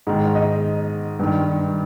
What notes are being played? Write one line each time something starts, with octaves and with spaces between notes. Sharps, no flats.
G#2 D#3
D#5
G2 D#3